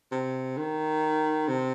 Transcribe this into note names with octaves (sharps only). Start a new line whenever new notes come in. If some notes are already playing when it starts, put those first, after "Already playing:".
C3
D#3
C3